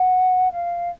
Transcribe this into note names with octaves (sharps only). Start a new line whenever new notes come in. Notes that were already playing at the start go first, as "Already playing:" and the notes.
Already playing: F#5
F5